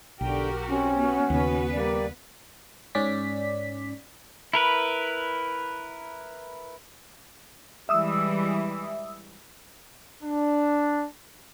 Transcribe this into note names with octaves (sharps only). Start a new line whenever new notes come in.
B1 D3 F#4 G4 A#4 G5
C4 C#4
B3 F#4
D#2 C#3 B3 B4
G3 A#3 D5
G#2 C#4 D5 B6
E4 A#4 B4
E3 G3 G#3 E5 D#6 E6
D4